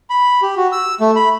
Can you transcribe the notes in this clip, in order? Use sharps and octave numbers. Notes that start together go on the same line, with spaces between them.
B5
G4
F#4
E6
A3
B5